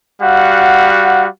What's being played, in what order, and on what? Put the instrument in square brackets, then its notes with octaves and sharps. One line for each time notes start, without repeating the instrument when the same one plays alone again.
[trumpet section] G3 F#4 F5 F#5